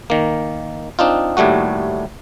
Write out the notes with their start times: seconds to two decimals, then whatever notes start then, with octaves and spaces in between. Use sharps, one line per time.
0.10 D#3 A#3
0.99 C4 D4 D#4 F4
1.37 D#2 A2 G3 A3 F#4